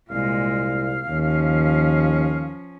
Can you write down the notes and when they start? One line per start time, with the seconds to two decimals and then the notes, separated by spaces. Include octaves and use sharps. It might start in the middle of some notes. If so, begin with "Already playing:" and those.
0.11 C2 A#2 G#3 F5
1.08 D#2 F3 C#4